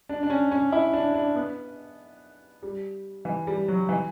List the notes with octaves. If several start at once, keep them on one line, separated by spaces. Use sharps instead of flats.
D4
D4
C#4
C#4
E4
D4
D4
B3
G3
E3
G3
F#3
E3